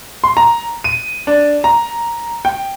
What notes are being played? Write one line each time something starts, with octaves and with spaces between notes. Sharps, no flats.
C6
A#5
D#7
D4
A#5
G5